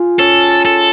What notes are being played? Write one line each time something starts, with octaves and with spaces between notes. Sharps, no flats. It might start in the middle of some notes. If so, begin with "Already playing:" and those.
Already playing: F4 G#4
C#4 A4
A4